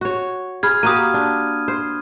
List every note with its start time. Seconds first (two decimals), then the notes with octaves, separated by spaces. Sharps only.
0.01 F#4 C#5
0.63 G#4 B5 F6 G#6
0.83 A#3 F#4 G4 D#6 D#7
1.14 D4
1.68 C5